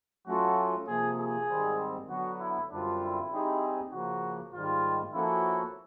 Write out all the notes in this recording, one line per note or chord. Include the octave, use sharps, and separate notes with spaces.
F#3 A3 C#4 F4 F#4 A4
C3 F3 A#3 G#4
G#4
G#2 D#3 G3 C4
D3 F#3 B3 F#4
E4
F#2 D3 G3 C4 D4 F4
E4
G3 C4 D#4 G#4
C#3 F3 A#3 F#4
G#2 D#3 G3 F4
F3 A#3 C#4 E4 F#4 A4